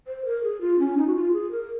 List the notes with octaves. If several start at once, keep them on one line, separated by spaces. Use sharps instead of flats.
C5
A#4
G#4
F4
C#4
D#4
F#4
F4
G#4
A#4